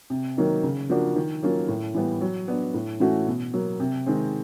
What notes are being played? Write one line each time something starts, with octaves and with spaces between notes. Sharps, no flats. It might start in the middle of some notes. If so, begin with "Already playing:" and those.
C3
D#3 F#3 A#3 D#4
C#3
F3 A#3 D4 F#4
D#3
F#3 A#3 C#4 F4
A2
E3 G3 B3
F#3
B3 D4
A2
E3 A3 C#4 F#4
B2
F#3 A#3
C3
D#3 G#3 C4